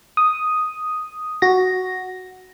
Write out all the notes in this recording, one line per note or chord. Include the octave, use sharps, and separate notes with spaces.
D#6
F#4 A#6